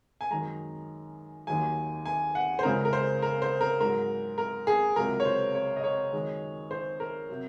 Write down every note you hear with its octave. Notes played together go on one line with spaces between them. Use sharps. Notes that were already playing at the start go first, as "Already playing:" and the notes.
G#5
F#2 D#3 G#3 A#5
D#2 D#3 F#3 G#5
G#5
F#5
C5
C#2 C#3 G#3 A#4
A#4
C5
A#4
C5
A#4
G#2 F#3 A#4
A#4
G#4
C#2 C3 F#3 A#4
C#5
C5
C#5
D#5
C#5
F#2 D#3 G#3
C5
A#4
C3 F#3